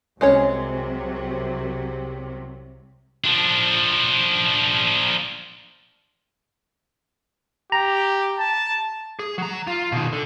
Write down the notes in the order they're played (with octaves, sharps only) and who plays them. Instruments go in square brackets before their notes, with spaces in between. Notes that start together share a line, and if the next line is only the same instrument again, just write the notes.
[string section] C2 C3 F#3 [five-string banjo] G#3 C#4 C#5
[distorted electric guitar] F3 D4
[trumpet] G4 [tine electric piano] A#5
[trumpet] A5
[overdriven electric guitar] G#4
F#3 A#5
F4
B2 D#3
D3